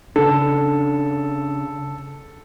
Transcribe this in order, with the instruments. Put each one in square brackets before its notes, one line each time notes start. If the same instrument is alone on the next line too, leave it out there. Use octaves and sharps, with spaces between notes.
[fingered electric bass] C#3 D4 [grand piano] A4